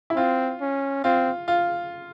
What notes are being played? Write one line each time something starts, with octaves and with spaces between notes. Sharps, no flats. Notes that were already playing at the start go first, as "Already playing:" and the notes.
E4
C4 F4
C#4
C4 F4
F4